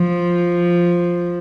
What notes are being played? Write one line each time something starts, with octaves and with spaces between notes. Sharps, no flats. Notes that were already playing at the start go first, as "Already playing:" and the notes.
Already playing: F3